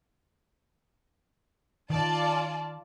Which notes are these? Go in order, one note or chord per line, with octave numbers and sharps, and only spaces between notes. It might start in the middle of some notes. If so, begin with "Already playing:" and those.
D#3 F4 D5 A5